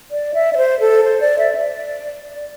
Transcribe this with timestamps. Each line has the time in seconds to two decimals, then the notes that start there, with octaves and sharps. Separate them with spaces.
0.11 D5
0.34 E5
0.53 D5
0.57 C5
0.80 A4
1.04 C5
1.20 D5
1.39 E5
1.55 D5